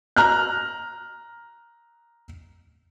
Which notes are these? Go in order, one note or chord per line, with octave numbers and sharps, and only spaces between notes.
A#5 F6 F#6